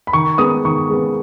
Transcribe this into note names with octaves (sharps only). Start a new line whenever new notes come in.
B5
D#3 C#6
G#3 B3 D#6
D#3 C#6
G#3 B3